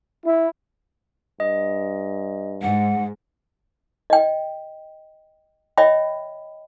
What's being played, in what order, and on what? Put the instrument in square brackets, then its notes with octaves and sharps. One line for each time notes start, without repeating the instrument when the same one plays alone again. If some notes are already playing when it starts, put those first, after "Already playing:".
[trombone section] E4
[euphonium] G2 [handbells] D#5
[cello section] G#2 [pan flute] F#5
[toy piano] D#5 G5
C#5 D#5 E5 G5 B5